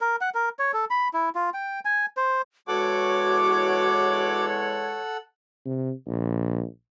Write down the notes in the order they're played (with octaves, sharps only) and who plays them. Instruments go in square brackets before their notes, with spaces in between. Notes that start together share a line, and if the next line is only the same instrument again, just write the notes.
[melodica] A#4
F#5
A#4
C#5
A4
B5
E4
F4
G5
G#5
C5
[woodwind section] E2 G#3 C#5 [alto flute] F#4 [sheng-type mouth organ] A4 F#5 [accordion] D6
[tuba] C3
A#1